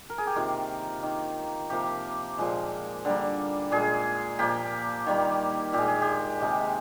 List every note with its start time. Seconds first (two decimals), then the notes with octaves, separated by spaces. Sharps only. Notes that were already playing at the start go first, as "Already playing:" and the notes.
0.10 A#4
0.18 G#4
0.27 G4
0.36 C3 D#3 A#3 F4
1.03 D#3 A#3
1.70 C3 F3 A#3 G4
2.38 A#2 F3 G#3
3.05 D3 G3 A#3
3.71 A#2 G#3 G#4
4.39 A#2 F3 A#3 G4
5.06 D#3 G3 A#3
5.73 A#2 G#3 G4
5.88 G#4
6.02 G4
6.41 C3 D#3 G#3